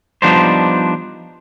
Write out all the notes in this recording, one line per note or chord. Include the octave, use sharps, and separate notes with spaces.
F3 G3 B3 D4 D#4 C5